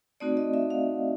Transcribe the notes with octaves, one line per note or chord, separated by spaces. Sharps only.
A3 C4 D#4 F#4 D5
D#5
E5
F5